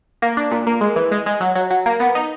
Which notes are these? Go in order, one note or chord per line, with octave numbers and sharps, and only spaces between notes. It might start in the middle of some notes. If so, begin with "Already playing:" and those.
A#3
D4
A#2
A#3
G#3
E3
G#3
G#3
F#3
F#3
F#3
A#3
B3
D#4